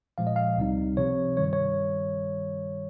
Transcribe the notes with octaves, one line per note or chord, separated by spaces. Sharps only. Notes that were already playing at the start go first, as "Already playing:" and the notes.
A#2 F3 G#3 F5
D#5
F5
C#2 C3 G3 C4 D#4
C3 F3 C4 C#5
G2 D#3 G3 C#5
C#5